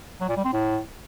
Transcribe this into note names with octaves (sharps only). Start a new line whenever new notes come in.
F#3
A#2
G3
C4
A2